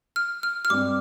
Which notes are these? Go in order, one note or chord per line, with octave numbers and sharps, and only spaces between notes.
F6
F6
F6
G2 G3 C4 D6